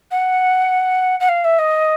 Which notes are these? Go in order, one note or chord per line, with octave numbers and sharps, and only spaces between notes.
F#5
F#5
F5
E5
D#5